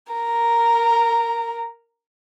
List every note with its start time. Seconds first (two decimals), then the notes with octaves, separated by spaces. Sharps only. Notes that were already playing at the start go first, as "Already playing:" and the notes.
0.13 A#4 A#5